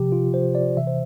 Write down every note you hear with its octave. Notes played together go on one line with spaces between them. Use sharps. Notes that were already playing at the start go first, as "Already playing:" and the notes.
Already playing: C3 F3 G4
F4
C5
D5
C3 E3 E5
C5